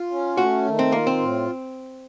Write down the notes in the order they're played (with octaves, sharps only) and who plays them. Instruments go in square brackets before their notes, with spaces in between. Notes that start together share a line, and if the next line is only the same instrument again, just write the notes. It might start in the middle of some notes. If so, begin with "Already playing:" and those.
Already playing: [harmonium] F4
C#4
[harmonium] A3 [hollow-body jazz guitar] F#4
[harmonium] D#3
[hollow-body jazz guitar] C4
[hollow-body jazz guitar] A#3 [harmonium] F4
[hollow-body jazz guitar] C4
[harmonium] A2